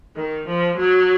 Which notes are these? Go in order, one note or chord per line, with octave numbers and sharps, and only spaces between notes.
D#3
F3
F#3